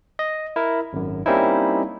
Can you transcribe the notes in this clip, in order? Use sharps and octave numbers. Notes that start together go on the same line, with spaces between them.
D#5
E4 A#4
G#1 F#2
G3 A#3 C4 C#4 D#4 E4